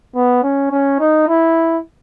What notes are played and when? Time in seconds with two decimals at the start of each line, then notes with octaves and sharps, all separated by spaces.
0.15 B3
0.43 C#4
0.71 C#4
1.00 D#4
1.28 E4